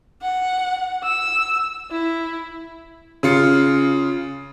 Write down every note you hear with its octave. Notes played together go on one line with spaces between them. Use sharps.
F#5
E6
E4
C#3 F4 C#7